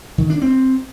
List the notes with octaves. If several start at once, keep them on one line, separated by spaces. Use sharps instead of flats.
D#3
D4
C4